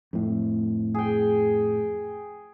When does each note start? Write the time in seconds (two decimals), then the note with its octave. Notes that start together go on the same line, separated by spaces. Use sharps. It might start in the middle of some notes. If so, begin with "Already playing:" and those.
0.13 F2 A2
0.95 G#4 G5